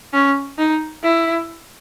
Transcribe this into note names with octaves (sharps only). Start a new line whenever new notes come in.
C#4
D#4
E4